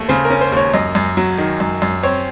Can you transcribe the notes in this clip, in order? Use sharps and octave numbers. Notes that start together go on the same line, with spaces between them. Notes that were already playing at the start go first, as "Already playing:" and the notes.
Already playing: D#2 A3
C#3 C5
A#4
C#4
C5
D#2 C#5
F#2 D#5
F#2
F#3
D#3
F#2
F#2
C4 C#5